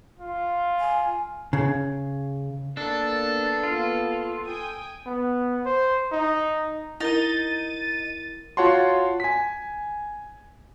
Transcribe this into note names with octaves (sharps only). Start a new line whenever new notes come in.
F4
G#5
C#3
A#3 B3 D4 A4
F4
G5 G#5 D#6
B3
C5
D#4
D#4 E4 A#4 A6 D#7 G7
F4 F#4 C#5 F#5 A5 C6
G#5 B6